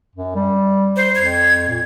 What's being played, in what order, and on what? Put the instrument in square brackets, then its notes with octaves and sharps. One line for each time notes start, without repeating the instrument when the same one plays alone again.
[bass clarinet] F#2
G3
[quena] C5
[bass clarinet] F2 [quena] G#6
[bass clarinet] A#2